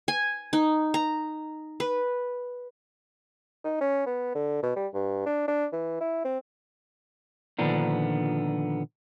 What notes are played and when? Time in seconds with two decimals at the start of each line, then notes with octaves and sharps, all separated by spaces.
0.08 G#5
0.53 D#4
0.94 A#5
1.80 B4
3.65 D#4
3.80 C#4
4.06 B3
4.35 D3
4.63 B2
4.76 G3
4.94 G2
5.26 D4
5.47 D4
5.73 E3
6.00 E4
6.25 C4
7.59 A#2 D3 D#3 F3 B3 D4